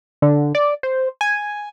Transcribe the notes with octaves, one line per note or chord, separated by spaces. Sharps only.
D3
D5
C5
G#5